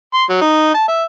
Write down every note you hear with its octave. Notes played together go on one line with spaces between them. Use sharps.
C6
F#3
D#4
A5
E5